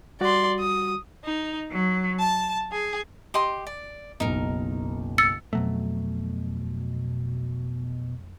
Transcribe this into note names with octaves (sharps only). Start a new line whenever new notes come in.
G3 F#4 D5 C6
D#6
D#4
F#3
A5
G#4
G4 D#5 C6
D5
F#1 B1 D#4 A#4
E6 A6 C#7
F2 B2 F#3 A3